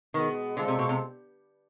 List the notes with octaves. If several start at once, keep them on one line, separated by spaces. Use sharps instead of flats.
B2 D#3 G#3 B3
D3 G#3 C4 F4 A4
C3
B2
C3